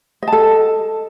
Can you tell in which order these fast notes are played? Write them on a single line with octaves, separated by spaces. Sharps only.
D#5 A5 A4